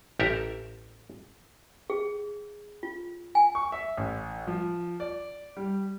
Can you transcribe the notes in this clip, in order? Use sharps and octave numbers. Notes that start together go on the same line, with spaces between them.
A1 G4 A4 A#4 E5
G#4
F4
G#5
C#6
E5
A1
F3
D5
G3